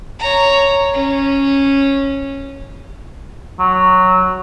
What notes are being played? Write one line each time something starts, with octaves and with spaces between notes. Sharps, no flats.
C#5 A#5
C#4
F#3